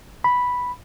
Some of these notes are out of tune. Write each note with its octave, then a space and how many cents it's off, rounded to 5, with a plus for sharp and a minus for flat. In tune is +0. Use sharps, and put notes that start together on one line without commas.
B5 -5